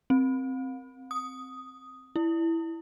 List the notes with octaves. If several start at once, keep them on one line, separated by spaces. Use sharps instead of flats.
C4
D#6
E4